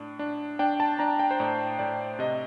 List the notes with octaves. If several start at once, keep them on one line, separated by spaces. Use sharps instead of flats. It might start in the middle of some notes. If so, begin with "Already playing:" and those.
Already playing: A2 D4
D4
D4 G5
A5
D4 A#5
G5
C5
A2 D5
A2 D5
C3 D#5